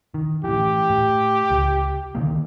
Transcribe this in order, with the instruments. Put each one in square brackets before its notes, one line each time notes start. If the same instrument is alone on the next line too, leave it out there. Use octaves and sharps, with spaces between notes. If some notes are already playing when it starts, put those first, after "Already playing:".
[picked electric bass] D#3
[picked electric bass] A2 E3 [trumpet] G4
[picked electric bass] A2
C#2
D3 D#3 A#3